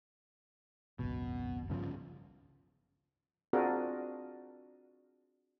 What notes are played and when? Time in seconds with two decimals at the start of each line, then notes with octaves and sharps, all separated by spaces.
0.99 G#1 C#2 F#2 B2
1.70 G2 C#3 F3
3.53 C4 D4 F4 F#4 G#4 A#4